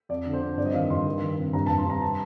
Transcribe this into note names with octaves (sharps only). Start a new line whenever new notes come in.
F2 D5
D3
C5
F2
G2 D5
D#5
D#3 F5
G2 C6
D#3
D#3
C3
G2 A#5
A5
G2
C6
G2 A#5
A5